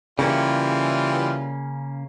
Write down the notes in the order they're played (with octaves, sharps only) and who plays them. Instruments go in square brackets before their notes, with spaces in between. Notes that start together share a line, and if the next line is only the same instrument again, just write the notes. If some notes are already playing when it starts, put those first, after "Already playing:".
[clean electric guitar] C#3 A#3 C#4 [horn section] E3 G3 F4